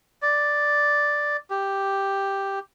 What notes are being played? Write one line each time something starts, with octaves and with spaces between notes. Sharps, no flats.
D5
G4